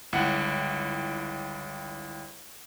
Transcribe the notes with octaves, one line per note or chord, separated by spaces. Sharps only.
G1 C#2 E4 F#5